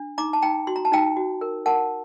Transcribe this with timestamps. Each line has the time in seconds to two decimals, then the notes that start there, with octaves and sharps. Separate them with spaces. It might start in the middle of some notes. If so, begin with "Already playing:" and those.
Already playing: D4
0.18 D#4 A#5 D6
0.33 A5
0.42 D#4 G5 A#5
0.67 F#4 C6
0.76 A#5
0.85 A5
0.92 D#4 G5 A#5
1.17 F#4
1.41 A#4
1.66 A#4 F#5 A5